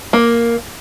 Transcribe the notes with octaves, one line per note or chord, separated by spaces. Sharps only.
A#3